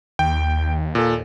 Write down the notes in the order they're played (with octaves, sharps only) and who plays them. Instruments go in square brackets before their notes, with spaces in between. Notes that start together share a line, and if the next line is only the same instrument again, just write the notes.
[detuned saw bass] D#2 [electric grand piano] G5
[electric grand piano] A#2 A4